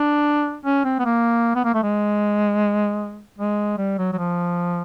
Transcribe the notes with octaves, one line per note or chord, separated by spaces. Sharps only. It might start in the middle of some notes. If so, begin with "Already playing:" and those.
Already playing: D4
C#4
C4
B3
A#3
B3
A#3
A3
G#3
G#3
G3
F#3
F#3
F3